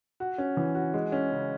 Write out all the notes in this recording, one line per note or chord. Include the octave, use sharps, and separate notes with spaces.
F#4
C#4
E3
F#4
G#3
C#4
C#3